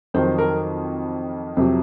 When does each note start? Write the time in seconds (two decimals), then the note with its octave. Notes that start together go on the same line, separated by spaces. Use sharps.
0.14 F2 D#3 F#3 C5
0.38 A#4
1.57 F2 C3 F#3